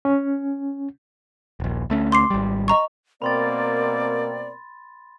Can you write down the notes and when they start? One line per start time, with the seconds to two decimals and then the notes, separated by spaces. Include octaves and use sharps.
0.05 C#4
1.60 D#1 A#1
1.90 D2 A3 C#4
2.12 C6 D6 C7
2.30 G#1 G3
2.68 D#5 A#5 C#6
3.22 B2 A#3 C4 A#4 D5 B5 C6 A6